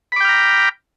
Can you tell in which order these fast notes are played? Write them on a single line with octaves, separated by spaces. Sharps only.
B5 D6 G5 F6 A#5